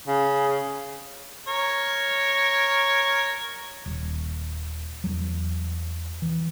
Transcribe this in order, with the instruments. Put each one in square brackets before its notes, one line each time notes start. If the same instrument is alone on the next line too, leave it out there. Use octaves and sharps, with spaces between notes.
[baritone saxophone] C#3
[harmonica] A#4 C#5
[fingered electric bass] D#1
E2 F#3
E3